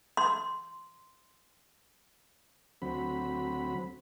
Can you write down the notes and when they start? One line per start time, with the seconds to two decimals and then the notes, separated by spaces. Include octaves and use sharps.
0.17 C6
2.82 D2 F#3 C4 B5